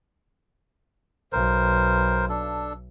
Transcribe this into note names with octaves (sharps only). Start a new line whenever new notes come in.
B1 A#4 C5
D4 A4